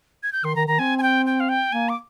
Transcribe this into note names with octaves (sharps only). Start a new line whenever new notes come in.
G#6
G6
D#3 C6
D#3 A#5
D#3 A#5
C4 G#5
G#5
G5
G5
F5
G5
A#3 G#5
D6